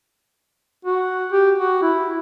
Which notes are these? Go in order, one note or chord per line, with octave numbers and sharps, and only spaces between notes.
F#4
G4
F#4
E4